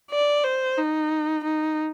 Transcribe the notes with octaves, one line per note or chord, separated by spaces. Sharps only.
D5
C5
D#4
D#4